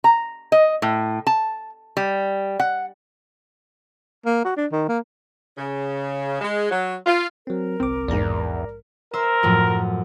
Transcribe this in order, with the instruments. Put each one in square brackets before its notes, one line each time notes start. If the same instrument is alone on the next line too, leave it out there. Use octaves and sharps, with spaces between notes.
[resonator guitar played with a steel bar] A#5
D#5
A2
A5
G3
F#5
[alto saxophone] A#3
F#4
D4
D#3
A#3
[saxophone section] C#3
G#3
F#3
F4
[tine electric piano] F#3 C4 [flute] A#4
[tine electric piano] G1 C2 D6 [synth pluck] C4
[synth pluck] A#1 G#2 [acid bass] E2 [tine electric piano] D5 A#5
[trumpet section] A#4 [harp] C5 E5 E6
[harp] F#2 A2 F3